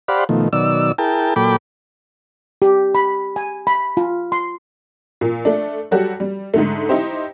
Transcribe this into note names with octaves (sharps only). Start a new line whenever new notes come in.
G4 C5 D5 F5 F#5 B5
B2 D#3 F3 A3
B2 D#3 F#3 D5 E6
E4 G#4 A#4 G5 A5
A#2 F#3 A4 G5 B5 D6
G4
B5
G#5
B5
F4
C6
A#2
A3 D4
F#3 G3 F#4 G4 A4
G3
G#2 D3 A3
D#4 E4 G4 C5